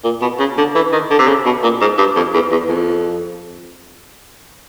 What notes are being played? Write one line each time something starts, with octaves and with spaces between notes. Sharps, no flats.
A#2
B2
C#3
D3
E3
D#3
D3
C3
C#3
B2
A#2
G#2
G2
F2
E2
E2
F2